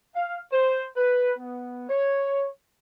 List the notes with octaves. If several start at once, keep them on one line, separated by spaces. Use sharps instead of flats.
F5
C5
B4
B3
C#5